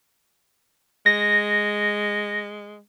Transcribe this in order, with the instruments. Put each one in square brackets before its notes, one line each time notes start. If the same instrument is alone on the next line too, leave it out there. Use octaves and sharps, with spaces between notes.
[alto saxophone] G#3 [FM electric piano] A#6